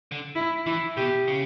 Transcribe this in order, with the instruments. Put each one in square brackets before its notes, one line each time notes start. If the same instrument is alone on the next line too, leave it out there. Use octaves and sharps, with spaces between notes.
[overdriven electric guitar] D3
[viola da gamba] E4
[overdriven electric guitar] E3 [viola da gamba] E4
[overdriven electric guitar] B2 [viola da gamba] G4
[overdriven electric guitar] C#3